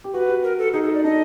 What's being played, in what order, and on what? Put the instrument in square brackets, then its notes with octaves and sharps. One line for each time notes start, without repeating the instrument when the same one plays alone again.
[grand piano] G4
[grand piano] F#4 [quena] B4
[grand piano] G4
[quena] A#4
A4
[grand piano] D#4 [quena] G#4
[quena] A4
D5
[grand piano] D4 [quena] D#5